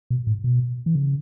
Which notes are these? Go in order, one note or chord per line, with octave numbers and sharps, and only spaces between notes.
B2
A2
B2
E3
C#3